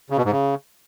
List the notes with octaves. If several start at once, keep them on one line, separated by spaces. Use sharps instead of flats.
C#3
B2
G#2
C#3